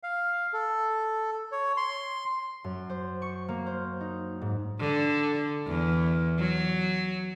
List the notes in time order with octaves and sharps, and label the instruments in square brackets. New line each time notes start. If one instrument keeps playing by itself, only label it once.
[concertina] F5
A4
C#5
C6
[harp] F#2
C5
C#6
A#3
C5
D#4
G#2
[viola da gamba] D3
E2
F#3